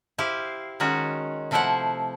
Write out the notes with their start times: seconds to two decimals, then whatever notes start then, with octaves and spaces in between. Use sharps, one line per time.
0.18 E4 G4 C5 F5
0.80 D#3 G#3 C#4 F#4
1.51 C3 F3 A3 E4 C5 F#5